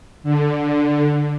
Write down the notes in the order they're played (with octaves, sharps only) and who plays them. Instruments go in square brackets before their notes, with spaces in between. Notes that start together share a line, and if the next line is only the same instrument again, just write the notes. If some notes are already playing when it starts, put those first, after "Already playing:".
[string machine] D3